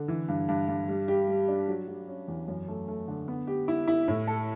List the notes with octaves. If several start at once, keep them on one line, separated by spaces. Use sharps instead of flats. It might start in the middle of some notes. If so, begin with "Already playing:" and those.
Already playing: D3
E3
G2
G2
G2
G3
G4
G3
D4
F#3
F#3
C#4
E2
F#2
A3
A3
D3
B3
G4
E4
E4
A2
A4